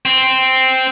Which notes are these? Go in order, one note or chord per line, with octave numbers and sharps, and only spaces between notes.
C4